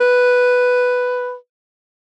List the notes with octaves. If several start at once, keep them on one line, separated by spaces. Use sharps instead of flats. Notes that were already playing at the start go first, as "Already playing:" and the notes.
B4